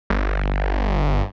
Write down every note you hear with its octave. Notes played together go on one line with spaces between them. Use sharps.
G1